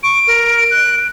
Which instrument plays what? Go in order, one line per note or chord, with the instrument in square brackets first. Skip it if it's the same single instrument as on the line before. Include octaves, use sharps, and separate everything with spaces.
[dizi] C#6 [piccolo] D7
[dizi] A#4
F#6